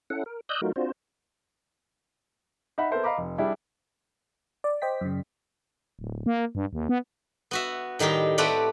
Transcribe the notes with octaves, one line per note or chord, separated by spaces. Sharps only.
C#4 E4 A4 F#5
A#4
D5 D#5 D#6 E6 F#6 G6
F#3 A3 D#4 F4 F#4 A#4
C4 D4 F4 F#4 C5
D#4 E5 F#5 B5
B3 A4 A#4 C5 E5
D#5 F5 A#5 B5 D6
F1
G3 D4 E4 G#4
D5
C5 D#5 G5 B6
F#2 C#3
D1
A#3
G2
D#2
B3
B3 F#4 E5
A2 D#3 G3 D#4 G4
A3 C4 G4 B4 D5 F#5